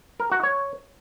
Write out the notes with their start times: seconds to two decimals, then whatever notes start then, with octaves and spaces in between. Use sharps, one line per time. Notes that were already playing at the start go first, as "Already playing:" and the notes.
0.20 A#4
0.32 F#4
0.43 C#5